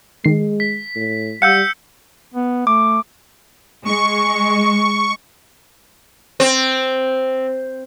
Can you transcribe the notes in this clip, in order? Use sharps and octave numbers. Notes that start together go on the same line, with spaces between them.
D#3 G#3 C7
B6
A2
G3 F5 F#5 E6 G6 C#7
B3
A3 D6
G#3 C#6
C4